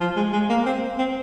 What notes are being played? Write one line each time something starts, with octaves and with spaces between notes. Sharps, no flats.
F3
G#3
G#3
A#3
C4
C4